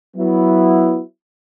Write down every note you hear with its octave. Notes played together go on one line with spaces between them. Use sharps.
F#3 B3 E4